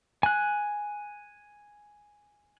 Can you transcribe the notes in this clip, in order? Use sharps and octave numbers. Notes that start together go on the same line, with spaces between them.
G#5 F#6